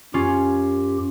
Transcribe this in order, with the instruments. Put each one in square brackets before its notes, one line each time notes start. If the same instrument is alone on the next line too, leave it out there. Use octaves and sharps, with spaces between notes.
[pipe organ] F#2 G4 [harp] C#4 F4